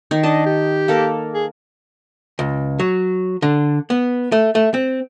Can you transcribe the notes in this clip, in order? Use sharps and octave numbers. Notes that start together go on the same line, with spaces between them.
D#3 D#4
D4 D#5 A5
G4
A#3 A4 A#4
G#4
C#2
F#3
D3
B3
A3
A3
C4